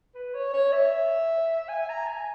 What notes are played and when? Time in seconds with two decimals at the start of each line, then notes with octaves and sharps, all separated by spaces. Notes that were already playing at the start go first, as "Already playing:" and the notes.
0.14 B4
0.34 C#5
0.53 C#5
0.72 E5
1.68 G#5
1.89 A#5
2.07 G#5